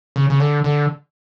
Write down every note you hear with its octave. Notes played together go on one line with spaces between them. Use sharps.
C#3
C#3
D3
D3